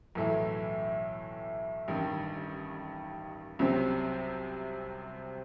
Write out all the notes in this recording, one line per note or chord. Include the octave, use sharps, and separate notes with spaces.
B1 A2 E3 A3 E4
A1 G2 D#3
C2 C3 F#3 C4